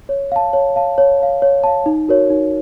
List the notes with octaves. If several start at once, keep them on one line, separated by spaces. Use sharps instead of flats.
C#5
F5 A5
C#5
F5 A5
C#5
F5 A5
C#5
F5 A5
D#4
F#4 A#4 C#5
D#4